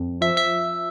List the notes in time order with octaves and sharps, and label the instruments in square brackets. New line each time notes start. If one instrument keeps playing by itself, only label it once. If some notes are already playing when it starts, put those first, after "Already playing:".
Already playing: [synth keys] F2
F3 E5
E5